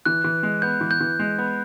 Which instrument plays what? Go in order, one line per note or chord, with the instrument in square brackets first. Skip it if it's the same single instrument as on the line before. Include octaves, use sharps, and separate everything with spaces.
[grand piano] E3 [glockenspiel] F#6
[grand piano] E3
G#3
[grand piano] B3 [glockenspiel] G6
[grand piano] E3
[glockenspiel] G6
[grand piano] E3
G#3
B3